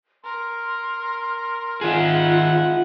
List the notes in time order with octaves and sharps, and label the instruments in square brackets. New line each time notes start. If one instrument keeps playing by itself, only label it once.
[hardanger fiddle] A#4 [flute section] C6 F6
[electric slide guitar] D#3 G#4 [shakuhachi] F4 [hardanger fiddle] E5 F#5